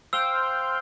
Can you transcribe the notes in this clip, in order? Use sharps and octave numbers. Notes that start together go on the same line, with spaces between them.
C5 F5 G5 E6